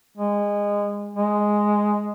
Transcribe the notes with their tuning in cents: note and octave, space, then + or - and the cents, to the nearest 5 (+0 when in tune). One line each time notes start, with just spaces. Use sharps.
G#3 -20
G#3 +0